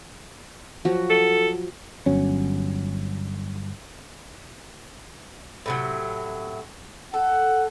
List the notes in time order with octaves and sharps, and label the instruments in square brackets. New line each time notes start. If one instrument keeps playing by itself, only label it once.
[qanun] F3 F#3 F#4
[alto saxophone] A4
[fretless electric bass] G1 F#3 C#4
[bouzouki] A2 C3 F#3
[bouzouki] A4 [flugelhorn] F#5